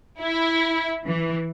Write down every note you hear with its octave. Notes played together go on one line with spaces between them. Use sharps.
E4
E3